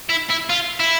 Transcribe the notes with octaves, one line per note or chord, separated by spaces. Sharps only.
E4
E4
F4
E4